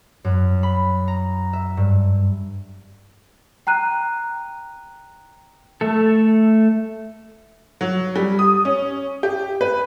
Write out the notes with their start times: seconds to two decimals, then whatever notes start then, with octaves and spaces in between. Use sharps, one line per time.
0.24 F#2
0.63 B5
1.08 A#5
1.53 E5
1.77 G2
3.67 G5 A#5 F#6 D#7
5.81 A3 A4
7.81 F#3
8.16 G3
8.39 D#6
8.65 C#4
9.23 G4
9.61 B4